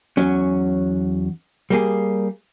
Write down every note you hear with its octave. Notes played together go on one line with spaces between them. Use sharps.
E2 F#3 C#4
G3 A#3 G#4